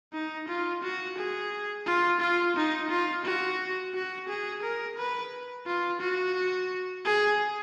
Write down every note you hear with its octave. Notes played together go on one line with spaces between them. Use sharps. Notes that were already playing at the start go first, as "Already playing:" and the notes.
D#4
F4
F#4
G#4
F4
F4
D#4
F4
F#4
F#4
G#4
A#4
B4
F4
F#4
G#4